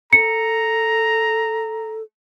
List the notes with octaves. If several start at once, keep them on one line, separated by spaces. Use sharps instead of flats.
A4 A#5 C#7